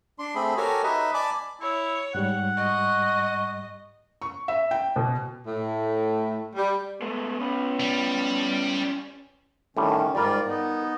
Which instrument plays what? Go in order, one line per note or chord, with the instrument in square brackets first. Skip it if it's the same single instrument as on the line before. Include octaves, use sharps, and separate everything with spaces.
[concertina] D4 C6
A3 C4 G#4 B5
F#4 G4 A4 A#4 C#5 G#5
D#4 B4 D#5 E5
D5 G#5 A5 B5 D6
[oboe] E4 [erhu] C#5
[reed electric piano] G#2 G3 [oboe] F#5
[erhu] D#5 [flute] C#6
[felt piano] C#6
E5
G5
B2
[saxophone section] A2
G3
[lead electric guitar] G#3 A3 [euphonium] B3
[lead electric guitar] C#4 B4
[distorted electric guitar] G3
[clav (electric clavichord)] A2 D3 G3 [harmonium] D#3 C#4
[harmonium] G#2 F4 D5 [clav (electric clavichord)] G3 A#4
[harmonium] B3 D#4